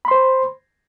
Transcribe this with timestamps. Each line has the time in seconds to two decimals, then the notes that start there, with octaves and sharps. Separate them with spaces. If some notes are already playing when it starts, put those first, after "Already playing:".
0.05 B5
0.08 C6
0.11 C5